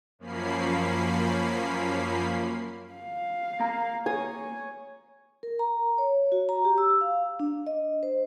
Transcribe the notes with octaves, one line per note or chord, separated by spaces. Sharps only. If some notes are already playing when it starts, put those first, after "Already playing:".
F#2 F3 A#3 C#4 B5 C7
F5
A#3 A#5
C#5 G#5 D#6
A#4
A#5
C#5
F#4
A#5
G4
E6
F5
D4
D#5
C5